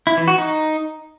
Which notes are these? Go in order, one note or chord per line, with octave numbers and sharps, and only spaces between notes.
E4
E3
F#4
D#4